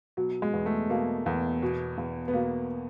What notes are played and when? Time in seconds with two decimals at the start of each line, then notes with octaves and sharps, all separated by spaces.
0.17 B2 F#3
0.42 G#3
0.53 E2
0.66 A3
0.90 B2 A#3
1.26 E2
1.63 B2
1.98 E2
2.28 B3
2.34 B2 A#3